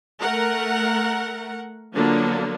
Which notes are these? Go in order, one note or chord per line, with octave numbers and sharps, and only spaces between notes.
A3 A#4 F#5
D3 F3 F#3 A#3 B3 D4